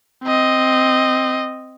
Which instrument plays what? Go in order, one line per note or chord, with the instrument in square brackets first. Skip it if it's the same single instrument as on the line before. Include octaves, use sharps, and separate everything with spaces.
[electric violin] C4 D#5